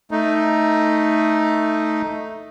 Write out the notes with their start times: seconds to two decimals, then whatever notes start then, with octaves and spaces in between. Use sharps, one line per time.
0.11 A3 D#4